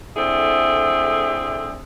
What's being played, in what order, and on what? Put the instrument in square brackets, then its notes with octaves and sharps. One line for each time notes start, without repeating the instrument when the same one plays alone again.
[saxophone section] D3 A3 C4 E4 G#4